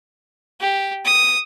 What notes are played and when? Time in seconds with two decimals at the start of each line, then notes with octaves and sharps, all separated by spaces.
0.61 G4
1.05 D#6